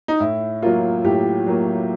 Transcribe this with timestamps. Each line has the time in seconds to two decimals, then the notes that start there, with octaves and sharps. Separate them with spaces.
0.08 D#4
0.20 A2 E4
0.62 F#3 A#3 F4
1.04 A2 G4
1.47 F#3 A#3